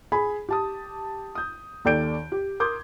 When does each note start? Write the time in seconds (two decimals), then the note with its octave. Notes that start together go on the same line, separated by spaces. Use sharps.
0.12 G#4 G#5 B5
0.49 G4 A5 D#6
1.35 D#6 G6
1.85 D#2 A4 D5 G5 G6 D7
2.32 G4
2.60 A#4 C6 D6 D#6 G6 G#6